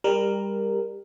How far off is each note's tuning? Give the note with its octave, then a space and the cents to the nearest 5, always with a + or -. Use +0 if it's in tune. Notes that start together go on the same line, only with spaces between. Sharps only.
G3 +25 G4 +0 A#4 +0